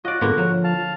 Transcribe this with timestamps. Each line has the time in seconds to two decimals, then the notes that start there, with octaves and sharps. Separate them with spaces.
0.05 F4 F#4 D5 D#5
0.21 G#2 D3 G#3 A#3 B3
0.38 F3 F#3
0.64 F5 A5